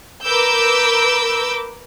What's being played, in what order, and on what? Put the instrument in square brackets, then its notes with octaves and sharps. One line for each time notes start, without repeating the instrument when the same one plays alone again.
[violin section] A#4 B4 D6 E6 G6